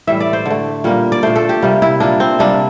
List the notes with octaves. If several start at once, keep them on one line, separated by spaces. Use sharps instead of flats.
A2 E3 G3 E5
D5
C5
D3 A3
A#2 G3 A#3
D5
A#2 A3 C5
A4
G4
C3 G3 A#3
E4
A#2 G3 A#3 D4
C4
C3 G3 A#3 D4